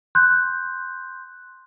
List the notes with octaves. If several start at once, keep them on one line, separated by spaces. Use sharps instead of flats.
C6 F#6 G6